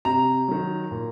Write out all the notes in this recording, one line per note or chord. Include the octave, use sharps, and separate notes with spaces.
C3 A#5
D#3 F#3
A#2